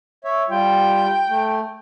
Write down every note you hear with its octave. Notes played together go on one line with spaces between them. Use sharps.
C#5 E5
G3 F4 G5
A3